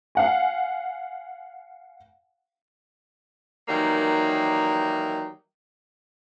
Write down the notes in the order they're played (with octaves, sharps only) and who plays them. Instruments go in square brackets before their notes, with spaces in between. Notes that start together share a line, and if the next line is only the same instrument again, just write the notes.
[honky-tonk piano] F5 F#5 G#5
[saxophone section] D#3 E3 F#3 G3 A#3